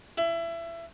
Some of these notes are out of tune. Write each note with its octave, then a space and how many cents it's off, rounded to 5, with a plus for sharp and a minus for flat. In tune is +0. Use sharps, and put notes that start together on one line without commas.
E4 +25